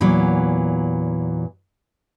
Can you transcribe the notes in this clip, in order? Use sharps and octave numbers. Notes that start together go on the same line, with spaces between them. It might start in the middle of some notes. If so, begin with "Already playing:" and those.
E2 A#2 E3 F#3 A#3